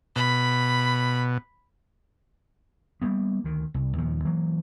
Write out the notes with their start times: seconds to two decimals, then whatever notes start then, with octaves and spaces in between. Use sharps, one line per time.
0.16 B2 B5
3.02 G3 G#3 A#3 B3
3.44 D2 D#3
3.74 C2
3.98 D#2 A#2 F3
4.25 E3 F#3 A#3